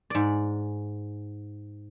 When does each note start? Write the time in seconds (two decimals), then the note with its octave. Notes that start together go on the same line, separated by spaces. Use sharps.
0.10 G#2 D5